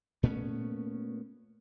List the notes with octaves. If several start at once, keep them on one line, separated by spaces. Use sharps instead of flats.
A#2 A3 B3 C#4